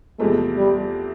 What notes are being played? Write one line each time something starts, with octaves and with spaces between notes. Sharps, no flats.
E2 C3 F3 G#3 A3
G3